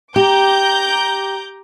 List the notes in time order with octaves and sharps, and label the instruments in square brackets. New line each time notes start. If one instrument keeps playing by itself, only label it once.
[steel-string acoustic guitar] G4 [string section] A#5 D6 G6